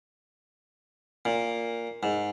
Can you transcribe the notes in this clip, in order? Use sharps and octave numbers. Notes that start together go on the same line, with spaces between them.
A#2
G#2